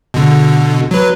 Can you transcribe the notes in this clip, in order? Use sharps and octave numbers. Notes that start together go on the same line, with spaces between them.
B2 D3
F#3 B4